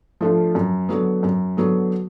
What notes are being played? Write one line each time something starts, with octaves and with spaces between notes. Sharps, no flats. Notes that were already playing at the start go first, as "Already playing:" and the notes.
F3 A3 D4 F4
F#2
D3 F#3 B3
F#2
D3 F#3 B3